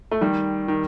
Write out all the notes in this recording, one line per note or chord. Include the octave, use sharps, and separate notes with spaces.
A3
D#3 G3
D#3